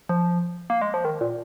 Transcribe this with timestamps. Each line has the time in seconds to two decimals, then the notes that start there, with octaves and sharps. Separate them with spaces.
0.09 F3
0.70 A#3
0.81 G#3
0.94 F3
1.05 D#3
1.21 A#2